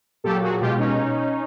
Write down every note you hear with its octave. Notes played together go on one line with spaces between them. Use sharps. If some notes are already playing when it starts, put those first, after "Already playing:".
A#2 F#3 G4 A4
F#4 G#4
B2 G#3 F4 G4
C#4 D#4